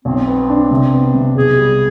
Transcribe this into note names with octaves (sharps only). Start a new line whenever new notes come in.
B1 C4
B3
D4
C3
B3
C3
B1 G#4
G3